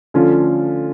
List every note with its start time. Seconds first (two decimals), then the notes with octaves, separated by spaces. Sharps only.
0.14 D3 F3 A3 C#4 F4